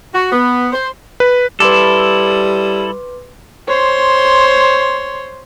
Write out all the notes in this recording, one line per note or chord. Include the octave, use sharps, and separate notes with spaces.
F#4
B3
C5
B4
G3 E4 A4 B4 C6 D6
C5 C#5 C6